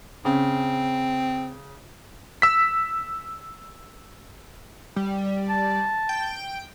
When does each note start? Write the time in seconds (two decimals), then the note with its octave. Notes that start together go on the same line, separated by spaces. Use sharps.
0.25 C#3 C4
2.42 E6 B6
4.96 G3
5.49 A5
6.09 G5